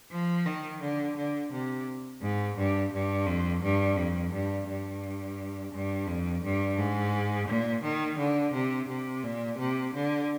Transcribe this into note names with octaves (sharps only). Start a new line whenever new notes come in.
F3
D#3
D3
D3
C3
G#2
G2
G2
F2
G2
F2
G2
G2
G2
F2
G2
G#2
A#2
D#3
D3
C3
C3
A#2
C3
D3